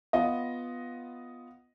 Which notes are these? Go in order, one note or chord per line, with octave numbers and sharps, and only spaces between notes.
B3 F4 D#5